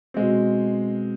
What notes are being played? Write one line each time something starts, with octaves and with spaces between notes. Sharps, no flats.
B2 G#3 C4